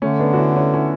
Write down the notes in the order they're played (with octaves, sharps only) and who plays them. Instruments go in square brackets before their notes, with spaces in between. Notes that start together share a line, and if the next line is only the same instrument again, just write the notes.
[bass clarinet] D3 [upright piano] A3 C#4
[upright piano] B3 D4
F#4
C#4 E4
C#4 E4
C#4 E4